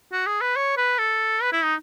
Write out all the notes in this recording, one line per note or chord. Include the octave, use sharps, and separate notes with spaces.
F#4
G#4
B4
C#5
B4
A4
B4
E4
D#4